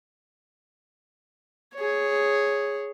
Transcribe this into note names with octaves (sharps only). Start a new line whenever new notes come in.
G#4 C#5